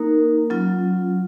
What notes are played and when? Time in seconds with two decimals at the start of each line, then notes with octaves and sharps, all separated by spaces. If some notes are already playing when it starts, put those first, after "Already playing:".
Already playing: A#3 D#4 A#4
0.50 F#3 C#4 F4